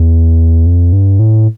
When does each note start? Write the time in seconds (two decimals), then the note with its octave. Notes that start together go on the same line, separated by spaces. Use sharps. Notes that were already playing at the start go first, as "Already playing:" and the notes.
Already playing: E2
0.66 F2
0.93 G2
1.19 A2